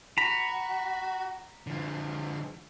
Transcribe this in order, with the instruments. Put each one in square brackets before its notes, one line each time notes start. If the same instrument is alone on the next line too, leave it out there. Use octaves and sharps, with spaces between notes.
[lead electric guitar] F#4 [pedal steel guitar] A#5 B5
[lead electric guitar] D3 F3